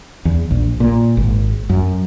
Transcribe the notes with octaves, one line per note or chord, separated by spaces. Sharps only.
E2
A#1
A#2
G#1
F#2